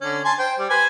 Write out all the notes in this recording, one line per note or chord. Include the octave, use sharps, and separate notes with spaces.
D3 C#4
G#5 A5 C6
C5 G5
G3
B4 C5 G#5